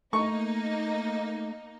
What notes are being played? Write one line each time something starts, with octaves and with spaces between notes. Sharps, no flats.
A3 A#3 D#4 C#6